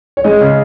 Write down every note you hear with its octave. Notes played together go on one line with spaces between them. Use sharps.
C#5
G#3 D#5
C#3 D#5